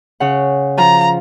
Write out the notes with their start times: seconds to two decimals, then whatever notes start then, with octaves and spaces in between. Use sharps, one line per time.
0.20 C#3 F#5
0.77 F3 F4 A#5